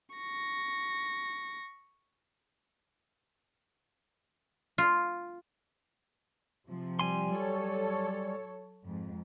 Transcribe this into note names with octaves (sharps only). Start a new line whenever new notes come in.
C#6 A#6
F4
C3 F3
G3 G#5 C6
F#3 A4 C#5
F2 G#2